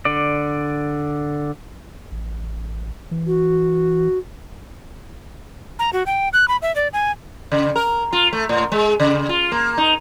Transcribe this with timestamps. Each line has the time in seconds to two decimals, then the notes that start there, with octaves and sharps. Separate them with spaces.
0.05 D3 D5
2.11 A1
3.11 E3
3.26 F#4
5.79 A#5
5.93 F#4
6.06 G5
6.33 F#6
6.48 B5
6.62 E5
6.76 D5
6.93 G#5
7.52 C#3
7.76 A#4
8.13 F4
8.33 A3
8.49 A2
8.72 G#3
9.00 C#3
9.29 F4
9.52 A#3
9.78 D#4